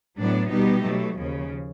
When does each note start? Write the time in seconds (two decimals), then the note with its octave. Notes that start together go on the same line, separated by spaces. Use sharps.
0.18 A2 F#3 B3 D4
0.50 B2 G3 B3 D#4 G4
0.83 B2 F#3 A3
1.16 D#2 C#3 F3